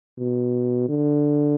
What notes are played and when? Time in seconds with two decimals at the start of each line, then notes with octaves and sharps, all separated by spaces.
0.18 B2
0.89 D3